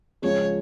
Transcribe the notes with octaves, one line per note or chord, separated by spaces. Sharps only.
C#2 C#3 F3 G#3 C#5